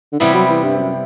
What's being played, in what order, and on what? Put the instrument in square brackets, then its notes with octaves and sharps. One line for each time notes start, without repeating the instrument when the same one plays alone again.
[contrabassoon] D3
[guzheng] C3 G3 B3 E4 [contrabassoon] E3
[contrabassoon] F#3
E3
G2
F#2